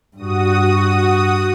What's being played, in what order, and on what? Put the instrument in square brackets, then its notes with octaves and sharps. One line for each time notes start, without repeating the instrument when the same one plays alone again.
[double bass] G2 [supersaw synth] F#4 D#6